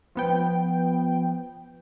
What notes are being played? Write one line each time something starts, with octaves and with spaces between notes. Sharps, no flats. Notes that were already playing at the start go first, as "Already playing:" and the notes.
F3 B3 G5